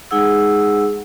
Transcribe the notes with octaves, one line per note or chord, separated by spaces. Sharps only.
G#3 D#4 G#4 F#5 E6